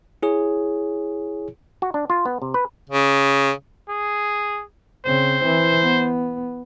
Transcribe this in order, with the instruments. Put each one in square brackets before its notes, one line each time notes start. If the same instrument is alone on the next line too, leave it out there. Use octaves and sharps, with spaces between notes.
[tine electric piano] E4 G#4 C#5
[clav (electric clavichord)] F#4
D4
F4
B3
C3
B4
[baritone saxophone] C#3
[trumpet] G#4
[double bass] C#3 C4 [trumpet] C5
[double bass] E3
B3